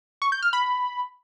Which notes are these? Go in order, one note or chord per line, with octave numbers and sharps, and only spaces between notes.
C#6
G6
F6
B5